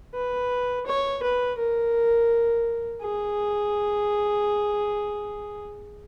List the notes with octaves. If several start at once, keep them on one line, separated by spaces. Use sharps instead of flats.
B4
C#5
B4
A#4
G#4